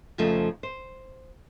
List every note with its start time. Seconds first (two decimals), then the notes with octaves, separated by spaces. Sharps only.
0.18 F2 C#3 F3 A3 D#4 F4
0.63 C5